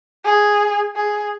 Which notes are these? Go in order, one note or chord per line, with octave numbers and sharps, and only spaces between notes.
G#4
G#4